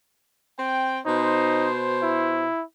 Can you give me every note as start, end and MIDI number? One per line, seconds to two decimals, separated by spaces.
0.59 0.98 60
0.59 0.98 79
1.06 2.48 47
1.06 1.70 63
1.06 2.48 72
2.03 2.63 64